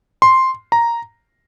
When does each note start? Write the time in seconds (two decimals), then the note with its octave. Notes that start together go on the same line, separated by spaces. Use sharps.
0.22 C6
0.72 A#5